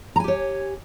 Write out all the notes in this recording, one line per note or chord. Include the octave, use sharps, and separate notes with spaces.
G4 C#5 G#5 A#5